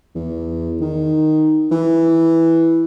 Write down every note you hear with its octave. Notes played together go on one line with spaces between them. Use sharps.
E2
D#3
E3